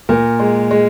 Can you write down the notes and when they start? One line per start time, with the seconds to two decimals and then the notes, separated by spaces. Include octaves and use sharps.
0.09 A#2 A#4
0.40 G#3
0.71 G#3